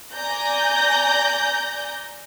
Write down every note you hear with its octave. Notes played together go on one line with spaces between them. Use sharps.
D5 G#5 A#5 G6 A#6